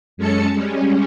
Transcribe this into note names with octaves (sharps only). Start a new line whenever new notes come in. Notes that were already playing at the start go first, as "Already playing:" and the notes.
F#2 G#3 C#4 A4 A5 C#7
G3 G#3 C#4